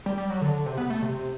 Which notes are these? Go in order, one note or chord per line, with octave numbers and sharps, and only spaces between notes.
G3
G3
F#3
D3
D3
C3
B3
A3
C3